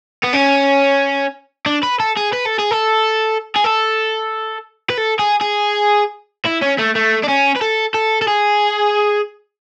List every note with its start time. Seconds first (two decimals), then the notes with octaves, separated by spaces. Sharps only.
0.24 B3
0.34 C#4
1.66 D4
1.83 B4
2.00 A4
2.17 G#4
2.32 B4
2.45 A4
2.59 G#4
2.71 A4
3.56 G#4
3.65 A4
4.90 B4
4.97 A4
5.19 G#4
5.41 G#4
6.46 E4
6.62 C#4
6.79 A3
6.96 A3
7.24 D4
7.29 C#4
7.56 B4
7.62 A4
7.94 A4
8.22 A4
8.28 G#4